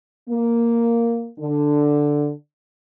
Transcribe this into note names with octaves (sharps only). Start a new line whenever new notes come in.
A#3
D3